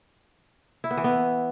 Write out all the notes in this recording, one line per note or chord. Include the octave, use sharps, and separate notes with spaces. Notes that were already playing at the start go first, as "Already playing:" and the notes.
E4
B3
E3
B3